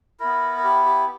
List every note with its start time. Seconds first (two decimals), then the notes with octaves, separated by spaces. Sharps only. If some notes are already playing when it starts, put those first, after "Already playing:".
0.20 B3 E4 A#4
0.57 A#4
0.64 G4
0.86 G4